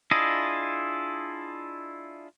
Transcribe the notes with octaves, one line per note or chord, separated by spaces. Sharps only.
D4 E4 F4 G#4 D#5